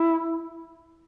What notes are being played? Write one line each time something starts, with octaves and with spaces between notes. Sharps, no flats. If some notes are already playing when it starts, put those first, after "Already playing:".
Already playing: E4